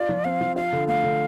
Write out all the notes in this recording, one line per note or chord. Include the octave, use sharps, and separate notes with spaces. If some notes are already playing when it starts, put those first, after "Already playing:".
Already playing: F4 D5
F3
C4 F5
F3
F4 F5
D3
A3 F5
D3